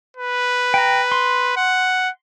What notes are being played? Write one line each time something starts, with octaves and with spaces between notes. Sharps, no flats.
B4
G5 A#5
C6
F#5